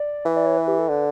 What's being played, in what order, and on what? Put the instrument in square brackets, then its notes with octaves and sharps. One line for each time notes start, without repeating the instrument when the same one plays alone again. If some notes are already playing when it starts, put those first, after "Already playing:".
Already playing: [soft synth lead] D5
[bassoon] E3 [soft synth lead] E5
[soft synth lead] D5
C#5
B4
G4
A4
[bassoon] D3 [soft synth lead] B4